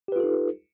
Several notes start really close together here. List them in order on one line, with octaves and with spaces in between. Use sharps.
G4 B4 F4 A4 D#4